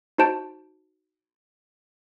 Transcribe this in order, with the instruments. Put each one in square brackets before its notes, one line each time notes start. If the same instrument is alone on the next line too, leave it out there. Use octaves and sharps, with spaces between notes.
[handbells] D#4 F#4 C5 A5 G6 D7